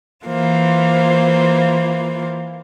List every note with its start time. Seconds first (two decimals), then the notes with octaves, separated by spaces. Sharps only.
0.24 E3 A#3 F4 C5